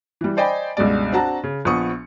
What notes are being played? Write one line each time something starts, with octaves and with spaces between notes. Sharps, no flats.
E3 G3
C5 D5 D#5 G5 G#5 B5
C#2 G2 B2 G#3 D5
C4 D4 F#4 A5 A#5
C#3
A#1 F3 B3 C#6 D#6 C#7